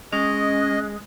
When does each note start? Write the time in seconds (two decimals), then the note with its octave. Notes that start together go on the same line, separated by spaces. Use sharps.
0.13 G#3 C#4 D#5